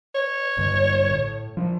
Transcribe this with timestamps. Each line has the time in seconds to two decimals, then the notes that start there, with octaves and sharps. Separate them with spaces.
0.15 C#5
0.57 A#1 G2 D3
1.11 A2
1.57 F3 D4